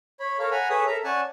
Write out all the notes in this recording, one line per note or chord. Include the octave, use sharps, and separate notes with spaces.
C#5 B5
A4 A#4 C#5 F5
F#5 G#5 A#5 B5
G#4 A4 B4 C#5 E5 D#6
A4 A#4 E5 A#5
C#4 D5 F#5 G#5 A5